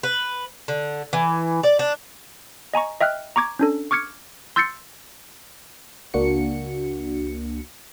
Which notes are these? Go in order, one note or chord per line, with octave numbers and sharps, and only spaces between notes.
B4
D3
E3
D5
D4
D#5 G#5 A#5 C#6
D#5 E5 G5 F6 F#6
A#5 C#6 D6 G#6
C#4 D4 A4
C#6 D6 F6 G#6 C#7
C6 E6 G6 A6 C7 C#7
C#2 A#3 D4 F#4 C#7